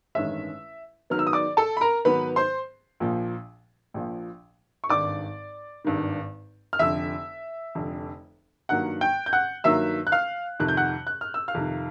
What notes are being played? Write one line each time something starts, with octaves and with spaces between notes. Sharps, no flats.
A1 G2 D#3 G#3 C#4 E5 E6
G#2 D#3 F#3 B3 F6
E6
D#6
D5 D6
A4 A5
B5
A#4 A#5
G#2 D#3 F#3 B3 B4 B5
C5 C6
A#1 A#2 F3
A#1 A#2 F3
C#6
G#1 G2 D#3 D5 D6
G#1 G2 D#3
F6
F1 F2 D3 E5 E6
F1 F2 D3
G2 D#3 F#3 A#3 F#5 F#6
G5 G6
G6
F#5 F#6
G2 D#3 F#3 A#3 E5 E6
F#6
F5 F6
F2 C3 D#3 F#6
G6
F#5 F#6
F#6
F6
E6
F5 F6
F2 C3 D#3